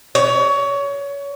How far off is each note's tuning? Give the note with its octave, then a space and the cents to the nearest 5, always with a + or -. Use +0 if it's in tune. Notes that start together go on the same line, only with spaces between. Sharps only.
C#5 +25